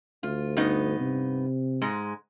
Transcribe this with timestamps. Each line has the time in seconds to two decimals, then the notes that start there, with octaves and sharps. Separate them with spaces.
0.23 D2 F4
0.57 G2 B3 D#4
0.99 C3
1.82 G#2 G#3